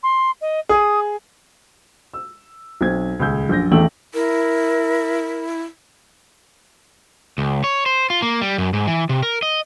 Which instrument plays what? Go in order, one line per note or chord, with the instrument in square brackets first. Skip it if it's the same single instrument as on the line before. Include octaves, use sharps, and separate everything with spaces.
[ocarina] C6
D#5
[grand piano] G#4 [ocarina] D#6
[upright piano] E6
B1 C4 G#6
D#1 C#2 G#4 E6 G6
A#1 F#2 G6 A#6
A1 E2 A3 G5 E6 F#7
[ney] E4 [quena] A#4
[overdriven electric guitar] C#2
C#5
C5
F4
A#3
G3
F#2
G#2
E3
C3
A#4
D#5